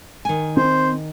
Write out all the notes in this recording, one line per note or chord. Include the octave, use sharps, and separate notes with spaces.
D#3 G#5
C4 C5